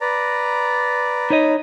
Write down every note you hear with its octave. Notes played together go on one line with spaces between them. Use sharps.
B4 D5 A#5
D#4 C#5 D#5 B5